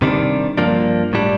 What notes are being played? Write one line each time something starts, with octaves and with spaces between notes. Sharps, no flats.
C3 D#3 G3 D4
G2 F3 A#3 D4
A2 G3 D4